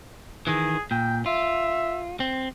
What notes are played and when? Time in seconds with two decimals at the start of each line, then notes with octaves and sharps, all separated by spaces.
0.47 D#3 E3 G#4
0.91 A#2 G5
1.26 F4 E5
2.20 C4